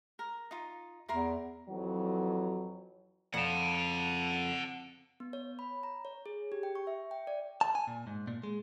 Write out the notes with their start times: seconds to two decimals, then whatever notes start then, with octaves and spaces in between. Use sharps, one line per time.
0.19 A#4
0.51 D#4 F4
1.09 E2 E4 A#4 C6
1.69 F2 E3 F#3
3.34 F2 F#5 A5
5.20 B3
5.33 C#5
5.59 B5
5.83 A#5
6.05 C#5
6.26 G#4
6.52 G4
6.63 G5
6.75 C#6
6.87 E5
7.11 G5
7.27 D5
7.61 A5
7.75 G#5
7.87 A#2
8.07 G#2
8.27 A#2
8.43 G#3